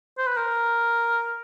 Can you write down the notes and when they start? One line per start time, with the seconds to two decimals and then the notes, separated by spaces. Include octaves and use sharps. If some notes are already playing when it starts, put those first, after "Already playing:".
0.18 C5
0.27 B4
0.37 A#4